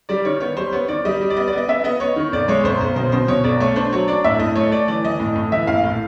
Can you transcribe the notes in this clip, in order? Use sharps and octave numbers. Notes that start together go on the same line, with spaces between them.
G3 D5
D#3 C#5
B3 C#5
G3 C5
B3 C#5
D#3 D5
G3 D#5
G3
D5
B3 D#5
D5
B3 D#5
B3 E5
B3 D#5
B3 C#5
D#3
B1 D5
G#3 C#5
B1 C5
B1
B2 C5
B2 C5
B2 C#5
B1 D5
A3 C#5
D4 C5
F#3 C#5
D4 D5
A2 E5
A2 D#5
A3 C#5
A3 D5
E3 D5
E3 D#5
A2
A2
E3 E5
A#1 F5
A2